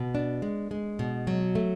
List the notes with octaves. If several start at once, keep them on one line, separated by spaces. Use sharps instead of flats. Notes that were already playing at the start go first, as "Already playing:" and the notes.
Already playing: B2
D4
G#3
G#3
B2
F#3
A3